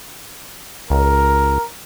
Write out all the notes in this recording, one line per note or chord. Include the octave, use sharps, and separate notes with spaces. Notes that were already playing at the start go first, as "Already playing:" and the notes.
C#2 A#4